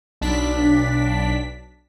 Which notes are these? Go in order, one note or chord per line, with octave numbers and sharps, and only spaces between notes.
B1 D4 B6